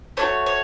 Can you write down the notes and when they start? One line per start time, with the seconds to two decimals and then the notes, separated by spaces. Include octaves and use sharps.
0.17 A3 D4 F#4 C#5
0.46 C#5